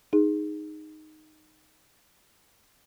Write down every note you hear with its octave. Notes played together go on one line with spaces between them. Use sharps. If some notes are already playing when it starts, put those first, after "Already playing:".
D#4 G#4